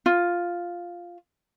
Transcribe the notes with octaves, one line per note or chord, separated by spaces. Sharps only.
F4